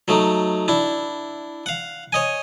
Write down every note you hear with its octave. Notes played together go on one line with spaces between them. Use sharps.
F#3 A3 D#4
D4 E4
F5 F#5
C#5 D#5 G#5